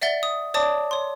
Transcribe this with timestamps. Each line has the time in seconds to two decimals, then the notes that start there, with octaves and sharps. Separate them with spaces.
0.01 D5 E5 F#5 A6 G7
0.23 D#6
0.54 C#5 D5 A5 D6 D#6
0.91 C#5 C6